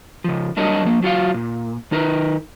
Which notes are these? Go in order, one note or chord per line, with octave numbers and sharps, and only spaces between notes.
C#3 F3
F#3 G3 D4 A#4 C#5 D#5
F3 A#3
F#3 F4 F#4 F5
A#2
D#3 D#4 A#4 B4